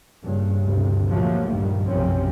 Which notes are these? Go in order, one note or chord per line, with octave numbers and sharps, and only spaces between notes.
G2 A#2 C#3
D2 G2 C3
A#2 F3 F#3 A3 A#3
A#1 G2 D#3 G3
B1 F#2 C3 F3 C4 C#4